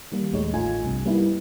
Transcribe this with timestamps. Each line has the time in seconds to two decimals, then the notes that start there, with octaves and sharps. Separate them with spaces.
0.12 D#3 G3 A#3
0.32 A#1 D#2 G#3 A3 D#4 C#5
0.54 A1 A3 D#4 F4 G#5
0.83 C2 G2 C3
1.05 G3 A#3 B3 D#4 E4